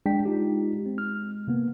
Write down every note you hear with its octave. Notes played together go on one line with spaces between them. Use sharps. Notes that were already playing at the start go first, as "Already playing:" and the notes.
G#3 D4 G5 B6
D#4 F4 G4
C4
F6
C3 A#3 B3